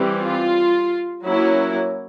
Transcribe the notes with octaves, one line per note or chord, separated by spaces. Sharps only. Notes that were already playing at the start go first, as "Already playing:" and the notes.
Already playing: E3 G3 C4
F4
F#3 A#3 C#4 E4